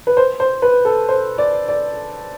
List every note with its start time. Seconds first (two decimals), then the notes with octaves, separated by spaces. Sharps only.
0.07 B4
0.17 C5
0.40 C5
0.62 B4
0.85 A4
1.09 C5
1.38 D5
1.68 D5